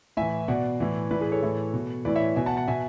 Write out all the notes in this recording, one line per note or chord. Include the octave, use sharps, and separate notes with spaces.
A2 E3 E5 G#5
B2 D5 F#5
A2 E3
A2 E3 B4 D5
G#4 B4
A4 C#5
A2 E3
B2
A2 E3 B4 D5
C#5 E5
B2 E5 G#5
F#5 A5
F#5 A5
B2 E5 G#5